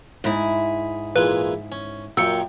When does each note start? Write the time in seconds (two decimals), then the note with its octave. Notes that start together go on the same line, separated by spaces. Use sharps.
0.24 G#2 E4 G#4
1.16 A#2 E3 G#3 B4
1.72 C#4
2.17 F#2 A#2 F#3 G5 E6 C#7